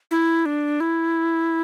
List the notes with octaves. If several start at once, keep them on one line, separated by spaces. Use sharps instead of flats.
E4
D4
E4